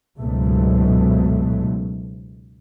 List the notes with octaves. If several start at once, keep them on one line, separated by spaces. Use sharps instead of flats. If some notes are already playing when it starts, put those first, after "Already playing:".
C#2 G#2 B2 F#3 A3